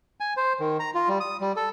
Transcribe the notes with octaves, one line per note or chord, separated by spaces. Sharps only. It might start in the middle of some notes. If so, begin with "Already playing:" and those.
G#5
C5
D#3
A#5
F4
G3
D#6
G3
A4